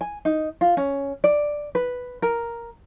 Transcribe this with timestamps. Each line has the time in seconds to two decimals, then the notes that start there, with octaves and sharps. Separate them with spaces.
0.01 G#5
0.25 D#4
0.61 F4
0.77 C#4
1.24 D5
1.75 B4
2.22 A#4